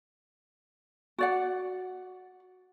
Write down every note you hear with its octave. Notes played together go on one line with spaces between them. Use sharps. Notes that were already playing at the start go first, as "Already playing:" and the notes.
F#4 D5 F#5